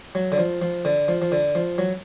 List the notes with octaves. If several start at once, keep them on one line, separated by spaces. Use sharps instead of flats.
F#3
D3
F3
F3
D3
F3
F3
D3
F3
F#3